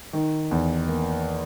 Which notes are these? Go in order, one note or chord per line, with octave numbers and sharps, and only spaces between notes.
D#3
E2
A#3